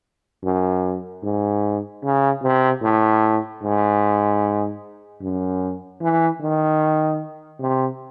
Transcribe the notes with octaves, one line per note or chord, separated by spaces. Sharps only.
F#2
G#2
C#3
C3
A2
G#2
F#2
E3
D#3
C3